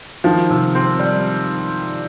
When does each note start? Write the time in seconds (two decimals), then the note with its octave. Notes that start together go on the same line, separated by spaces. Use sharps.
0.24 D#3 F3
0.50 C3
0.75 C4
0.99 G3